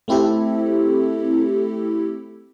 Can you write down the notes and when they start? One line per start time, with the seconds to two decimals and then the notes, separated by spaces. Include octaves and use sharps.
0.08 A3 C4 E4 G4 A4